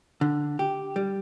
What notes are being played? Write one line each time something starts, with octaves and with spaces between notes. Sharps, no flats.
D3
G4
G3